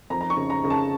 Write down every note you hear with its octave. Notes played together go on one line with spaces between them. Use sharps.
F2 A#5
A#5
C#6
C#3
A#5
C#3
A5